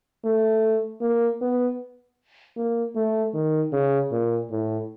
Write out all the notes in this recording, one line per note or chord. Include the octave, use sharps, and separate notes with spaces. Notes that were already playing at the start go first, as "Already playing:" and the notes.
A3
A#3
B3
A#3
A3
D#3
C#3
A#2
A2